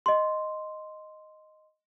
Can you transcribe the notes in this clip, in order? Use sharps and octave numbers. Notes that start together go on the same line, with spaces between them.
D#5 C6